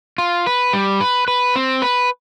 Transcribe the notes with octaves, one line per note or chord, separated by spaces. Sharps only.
F4
B4
G3
B4
B4
C4
B4